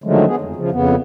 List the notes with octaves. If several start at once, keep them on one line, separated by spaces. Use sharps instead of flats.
D3 D#3 F3 F#3 G#3 A3
B3 G#4
F2
C#3 F3
F2 C#3 B3